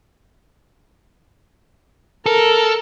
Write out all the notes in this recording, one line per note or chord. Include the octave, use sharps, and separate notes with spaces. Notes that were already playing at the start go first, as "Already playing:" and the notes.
A4 A#4